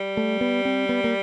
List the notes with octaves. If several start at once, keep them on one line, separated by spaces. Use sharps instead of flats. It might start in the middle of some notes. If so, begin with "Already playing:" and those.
Already playing: G3
A3
B3
C4
B3
A#3